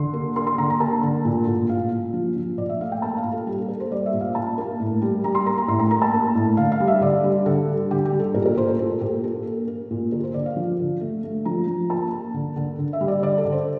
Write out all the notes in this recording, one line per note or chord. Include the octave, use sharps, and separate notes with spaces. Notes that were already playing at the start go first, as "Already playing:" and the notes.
Already playing: D3 C6
A#3
A#3 C6
C6
D3 A#5
A#5
A#3 A5
D3
A#2
A#2
A#2 F5
A#2
F3
F3
A#2 D5
E5
A3 F5
G5
A#3 A5
F5
A#2
A4
G3 G4
A4
A#3 A#4
C5
G3 D5
E5
A#2
F5
A#2 A5
A#3
A2
G3
G3 A#5
C6
A#3 A#5
A#5
A2 C6
A#5
A#3 A#5
A5
A#3
A2
D3 F5
F5
G3
E5
D3 D5
G3
D3 A4
G3
D3 G4
G4
G3
A4
A#2 A#4
A#4
A#2 C5
A4
A#2 A4
A#2 G4
A#3 A4
A#3
A#3
A#2
D3 A#4
C5
D3 D5
F5
F3
D3
A3
A3
F3 A#5
F3
A#3 A5
A#3
D3
D3
D3
E5
G3
D5
D3 D5
A4
D3
C5